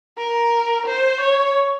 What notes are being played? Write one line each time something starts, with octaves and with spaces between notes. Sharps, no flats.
A#4
C5
C#5